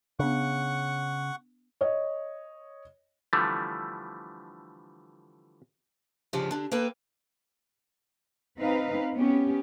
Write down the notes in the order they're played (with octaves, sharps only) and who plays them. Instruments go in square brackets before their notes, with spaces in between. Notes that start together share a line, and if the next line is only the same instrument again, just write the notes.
[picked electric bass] C#3 [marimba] B3 D4 [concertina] F#5 C#6
[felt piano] C#5 D#5
[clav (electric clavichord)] D3 E3 F3 G3 A3
[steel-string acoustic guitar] E2 G#2 C#3 F3 D4 G4
D3 D4
A#3 A4 B4 G5
[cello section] C4 D#4 B4 F5
B3 C#4 G4